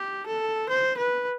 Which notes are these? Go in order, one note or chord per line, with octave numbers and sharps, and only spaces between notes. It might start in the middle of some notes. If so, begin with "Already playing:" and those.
Already playing: G4
A4
C5
B4